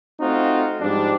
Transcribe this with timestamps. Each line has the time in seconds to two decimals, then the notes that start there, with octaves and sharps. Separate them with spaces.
0.20 A3 C4 D#4 F4 F#4
0.81 G#2 F3 G3 D4